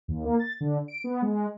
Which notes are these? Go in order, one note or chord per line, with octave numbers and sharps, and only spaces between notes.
D#2
A#3
A6
D3
D7
B3
G#3